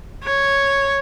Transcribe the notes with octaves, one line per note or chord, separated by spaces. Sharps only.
C#5